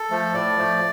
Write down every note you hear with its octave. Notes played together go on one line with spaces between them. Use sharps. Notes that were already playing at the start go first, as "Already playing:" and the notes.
Already playing: A4
F3 A3
A2 D5
F3 A3